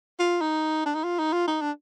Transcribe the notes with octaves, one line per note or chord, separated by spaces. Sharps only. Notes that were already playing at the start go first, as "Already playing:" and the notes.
F4
D#4
D4
D#4
F4
D#4
F4
D#4
D4